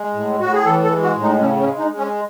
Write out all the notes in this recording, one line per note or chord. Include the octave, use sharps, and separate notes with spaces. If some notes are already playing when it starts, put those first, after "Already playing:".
Already playing: G#3
A2
A2 F#4
G#4
E3 A4
A4
G#3
F#4
A2
D#4
C#3 C#4
C#4
G#3
D#4
G#3
C#4